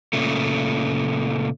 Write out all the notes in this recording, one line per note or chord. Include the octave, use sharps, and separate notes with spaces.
A#2 C#3 A3